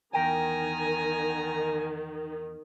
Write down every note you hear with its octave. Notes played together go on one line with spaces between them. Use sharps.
E2 D#3 A#4 G5 G#5 A#5